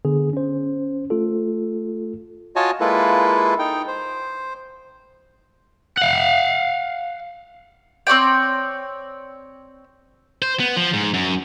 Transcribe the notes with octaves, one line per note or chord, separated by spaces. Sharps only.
D3 B3 G#4
C#4 C5
A3 F4 A4
F4 F#4 C#5 D#5 G#5 A5
G#3 A#3 E4 F4 A4 B4
D#4 G5
C5
F5 F#5
C4 C#5 D5 G5
C5
B3
F3
G#2
F#2